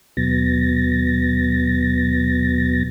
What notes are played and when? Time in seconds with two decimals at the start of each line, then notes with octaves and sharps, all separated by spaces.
0.17 D#2 B2 F#3 B3 A6 A#6